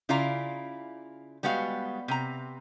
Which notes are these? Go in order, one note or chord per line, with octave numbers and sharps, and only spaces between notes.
C#3 E4 F4 D5 F5 A#5
G3 G#3 B3 F#4 F5
C3 A#5